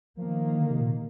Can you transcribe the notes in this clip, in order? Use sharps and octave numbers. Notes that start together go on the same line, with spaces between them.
D#3 F3 A#3
D3
C3
A#2